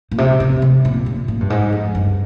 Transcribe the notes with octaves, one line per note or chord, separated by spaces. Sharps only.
A#2
C3
C3
C3
A#2
A#2
A#2
G2
G#2
F2
G2